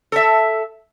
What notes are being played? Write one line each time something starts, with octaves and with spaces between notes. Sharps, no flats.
A4 E5